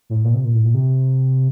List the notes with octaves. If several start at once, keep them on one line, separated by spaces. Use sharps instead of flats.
A2
A#2
C3
A#2
A2
A#2
C3